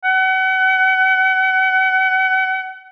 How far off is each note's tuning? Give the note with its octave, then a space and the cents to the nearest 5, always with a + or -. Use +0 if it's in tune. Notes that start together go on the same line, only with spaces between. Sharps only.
F#5 +35